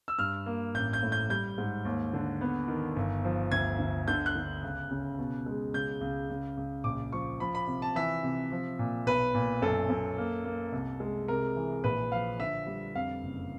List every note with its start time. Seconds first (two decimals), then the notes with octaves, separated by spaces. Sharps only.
0.08 E6
0.18 G2 F6
0.46 A#3
0.74 A1 G6
0.93 G6
1.03 A2
1.12 G6
1.30 G3 G6
1.58 G#2
1.85 D#2
2.14 D3
2.41 B3
2.68 D#3
2.96 G1
3.25 F3
3.51 D2 G#6
3.79 D2
4.08 D3 G6
4.26 F#6
4.35 D3
4.63 C#2
4.91 C#3
5.18 B2
5.46 G#3
5.74 C#2 G6
6.01 C#2
6.30 C#2
6.57 C#2
6.84 A#1 D6
7.12 F3 C#6
7.40 F3 B5
7.55 B5
7.67 C3
7.82 A5
7.96 E3 E5
8.23 C3
8.52 F3
8.79 A#2
9.06 B1 B4
9.34 A#2
9.62 F#2 A4
9.90 F#2
10.18 A#3
10.45 A#3
10.72 C2
11.00 G#3
11.28 C3 A#4
11.57 E3
11.84 A#1 B4
12.12 F3 F5
12.40 D3 E5
12.67 G3
12.95 F2 F5
13.23 F#1